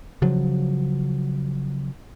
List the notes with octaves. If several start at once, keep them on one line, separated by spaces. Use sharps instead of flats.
C#3 F3 F#3